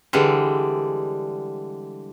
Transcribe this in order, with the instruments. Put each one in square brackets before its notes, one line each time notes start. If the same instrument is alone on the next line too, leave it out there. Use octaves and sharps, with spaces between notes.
[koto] D3 E3 G3 G#3